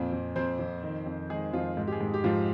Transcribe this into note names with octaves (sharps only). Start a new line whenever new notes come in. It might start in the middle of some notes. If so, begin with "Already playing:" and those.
Already playing: F2 A#2 C4
F2
F2 C4 C5
F2
D#3
F2
D#3 G#3 G#4
F2 F3 F4
G#2
G4
G#3 G#4
G#2
G4
G#2 F3 F4